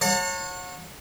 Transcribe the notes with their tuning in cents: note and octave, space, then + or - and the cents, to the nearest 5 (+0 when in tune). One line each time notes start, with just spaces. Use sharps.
C#5 -20 F#5 -35 A5 +40